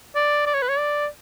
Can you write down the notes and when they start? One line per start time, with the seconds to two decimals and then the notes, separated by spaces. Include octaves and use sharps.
0.16 D5
0.46 D5
0.54 C#5
0.62 B4
0.69 C#5
0.79 D5